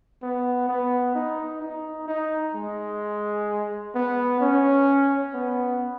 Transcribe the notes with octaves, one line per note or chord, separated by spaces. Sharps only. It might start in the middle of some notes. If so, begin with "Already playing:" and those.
B3
B3
D#4
D#4
D#4
G#3
B3
C#4
B3